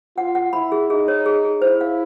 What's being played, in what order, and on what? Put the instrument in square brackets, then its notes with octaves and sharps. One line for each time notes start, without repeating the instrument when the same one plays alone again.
[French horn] F4 [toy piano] F#5
[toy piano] F#5
[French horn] E4 [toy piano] B5
[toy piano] G#4
[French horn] D#4 [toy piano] G#4
[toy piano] C#5
G#4
G#4
[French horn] E4 [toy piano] C5
[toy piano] F5